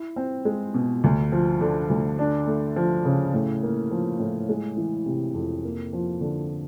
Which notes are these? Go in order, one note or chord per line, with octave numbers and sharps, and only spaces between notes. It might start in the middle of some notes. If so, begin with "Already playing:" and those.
Already playing: E4
C4
G#3
B2
D2
F3
D3
D2
D4
A3
F3
C#3
A2
A#3
F3
A2
G#3
E3
C3
F2
A#3
F3
D3